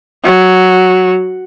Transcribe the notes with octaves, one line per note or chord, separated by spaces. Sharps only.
F#3